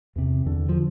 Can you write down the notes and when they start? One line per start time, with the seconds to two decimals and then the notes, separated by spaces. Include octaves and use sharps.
0.16 E2 C3
0.46 E2 D3
0.69 F3